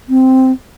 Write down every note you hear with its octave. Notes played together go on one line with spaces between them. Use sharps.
C4